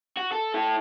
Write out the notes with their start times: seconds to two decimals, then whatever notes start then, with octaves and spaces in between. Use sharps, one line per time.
0.17 F#4
0.32 A4
0.54 E4 A4